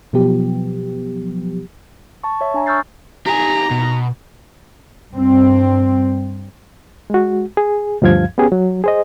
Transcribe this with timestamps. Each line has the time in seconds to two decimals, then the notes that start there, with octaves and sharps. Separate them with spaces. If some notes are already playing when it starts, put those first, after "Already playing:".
0.13 B2 F3 F#3 B3 G4
2.24 A5 C#6
2.41 C#5 E5
2.54 D4 G#5 A#5
2.66 C#6 E6 F6 G6 A6 C7
3.26 D#4 G4 G#5 A#5
3.71 B2
5.14 G2 C4
7.10 G#3 F#4
7.57 G#4
8.02 D2 G2 F3 F5 G#6
8.38 B3 C#4 G4 G#4
8.52 F#3
8.84 G#4 C5 D#5